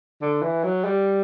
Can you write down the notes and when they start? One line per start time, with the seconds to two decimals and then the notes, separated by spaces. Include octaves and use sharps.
0.21 D3
0.42 E3
0.64 F#3
0.84 G3